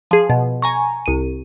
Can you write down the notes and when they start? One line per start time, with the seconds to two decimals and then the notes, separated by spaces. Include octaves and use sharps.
0.11 F3 G#4
0.30 B2
0.62 G#5 A#5 C#6
1.06 C2 D#7